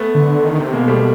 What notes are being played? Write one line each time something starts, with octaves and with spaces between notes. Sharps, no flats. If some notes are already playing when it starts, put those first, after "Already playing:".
Already playing: A3 B3
D3
D#3
C3
B2 G#3 A#3
G3 A3